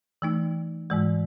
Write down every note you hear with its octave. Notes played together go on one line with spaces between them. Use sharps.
E3 A3 D#4
G#2 E3 G#3